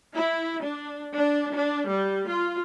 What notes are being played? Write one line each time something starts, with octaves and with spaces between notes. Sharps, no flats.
E4
D4
D4
D4
G3
F4